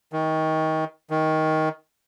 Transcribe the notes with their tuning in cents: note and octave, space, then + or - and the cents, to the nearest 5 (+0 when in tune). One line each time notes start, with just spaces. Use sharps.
D#3 +25
D#3 +15